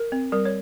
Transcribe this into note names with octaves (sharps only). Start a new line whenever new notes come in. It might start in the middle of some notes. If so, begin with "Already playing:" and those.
Already playing: A#4
C4
G3 A#4
C#5